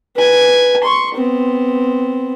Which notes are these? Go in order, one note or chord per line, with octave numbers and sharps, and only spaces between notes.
B4 G#5
C6 C#6
B3 C4